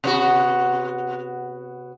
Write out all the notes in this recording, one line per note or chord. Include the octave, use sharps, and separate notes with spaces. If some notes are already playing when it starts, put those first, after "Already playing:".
C3 B3 F#4